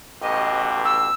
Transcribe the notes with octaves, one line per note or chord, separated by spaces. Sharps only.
A1 B2 G4 D#5
E6